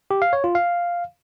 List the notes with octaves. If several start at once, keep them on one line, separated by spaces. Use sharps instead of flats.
G4
F5
C#5
F4
F5